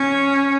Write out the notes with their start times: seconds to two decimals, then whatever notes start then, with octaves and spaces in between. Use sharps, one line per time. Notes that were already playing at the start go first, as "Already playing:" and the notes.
Already playing: C#4